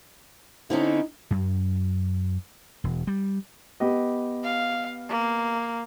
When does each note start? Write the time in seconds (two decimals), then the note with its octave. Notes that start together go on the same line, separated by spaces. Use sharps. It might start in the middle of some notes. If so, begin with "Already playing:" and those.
0.70 D3 C4 C#4 D#4 E4
1.31 F#2
2.84 E1
3.07 G3
3.80 B3 G4 D#5
4.44 F5
5.09 A#3